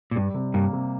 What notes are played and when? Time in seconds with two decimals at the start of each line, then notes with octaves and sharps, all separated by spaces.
0.11 A#2
0.16 G2 G3
0.34 C3
0.54 G2 A#3
0.73 C3